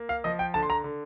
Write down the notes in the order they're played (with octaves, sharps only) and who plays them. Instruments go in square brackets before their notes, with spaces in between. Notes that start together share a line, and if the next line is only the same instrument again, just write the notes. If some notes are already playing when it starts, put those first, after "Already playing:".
Already playing: [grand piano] A#3
F5
F3 D#5
G5
D3 A5
C6
A#5
D3